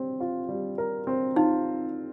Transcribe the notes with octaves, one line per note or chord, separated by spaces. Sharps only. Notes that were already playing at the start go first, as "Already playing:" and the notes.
Already playing: G3 C4
F4
G3
A#4
C4
D#4 F4